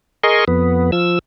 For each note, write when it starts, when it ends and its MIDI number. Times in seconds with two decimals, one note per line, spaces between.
0.23 0.45 68
0.23 0.45 70
0.23 0.45 75
0.23 0.45 84
0.23 0.45 85
0.48 0.91 41
0.48 0.91 59
0.92 1.19 53
0.92 1.19 88